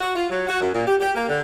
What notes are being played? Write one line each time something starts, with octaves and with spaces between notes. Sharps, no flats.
F#4
F4
F#3
F#4
F#2
A#2
G4
G4
A#3
D3